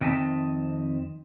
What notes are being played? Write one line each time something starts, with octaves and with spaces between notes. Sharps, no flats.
F2 D#3 C4 D#5 E5 A5